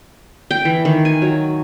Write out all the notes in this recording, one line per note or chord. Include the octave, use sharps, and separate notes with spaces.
G5
E3
D#3
G#5
F#3